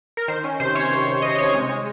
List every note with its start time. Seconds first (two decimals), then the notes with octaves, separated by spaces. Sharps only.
0.17 A#4
0.28 D#3 C5
0.44 C#4
0.60 C3 C5
0.75 C#4 C#5
0.92 C3
1.07 C3
1.22 C3 D#5
1.38 C3 C#5
1.54 G#3
1.69 G#3